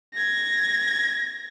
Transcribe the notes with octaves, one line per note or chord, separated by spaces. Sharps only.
G#6 A#6